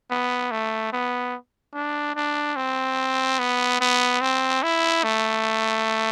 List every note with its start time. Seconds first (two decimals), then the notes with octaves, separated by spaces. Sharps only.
0.11 B3
0.51 A3
0.92 B3
1.74 D4
2.16 D4
2.56 C4
3.39 B3
3.80 B3
4.21 C4
4.63 E4
5.03 A3